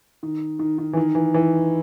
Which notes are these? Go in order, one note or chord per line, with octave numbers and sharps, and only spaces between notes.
D#3
D#3
D#3
E3
D#3
E3
E3